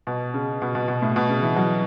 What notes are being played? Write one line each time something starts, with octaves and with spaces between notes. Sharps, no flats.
B2
C#3
B2
B2
B2
A2
B2
C#3
E3
F#3